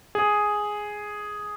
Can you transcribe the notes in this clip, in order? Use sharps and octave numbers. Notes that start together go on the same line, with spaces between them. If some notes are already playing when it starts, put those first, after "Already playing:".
G#4